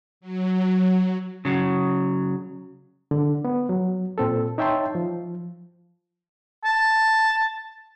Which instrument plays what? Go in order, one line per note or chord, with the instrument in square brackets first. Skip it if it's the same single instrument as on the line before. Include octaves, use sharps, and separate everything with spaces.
[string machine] F#3
[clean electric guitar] C#3 F#3
[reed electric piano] D3
B3
F#3
A#2 C4 A4
D#4 C#5 E5 G5 A5 C6
F3
[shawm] A5